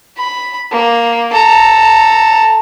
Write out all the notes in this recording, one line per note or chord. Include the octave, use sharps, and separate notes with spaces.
B5
A#3
A4 A#5